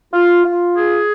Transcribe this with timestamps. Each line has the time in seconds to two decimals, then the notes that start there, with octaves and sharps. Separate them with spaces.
0.13 F4
0.45 F4
0.76 G#4